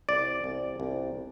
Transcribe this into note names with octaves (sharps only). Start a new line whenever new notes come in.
C2 D5
C2
C2